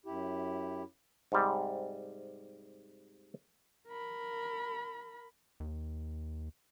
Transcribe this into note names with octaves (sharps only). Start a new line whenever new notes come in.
F#2 E4 G4
G#2 C3 G3
A#4 B5
D#2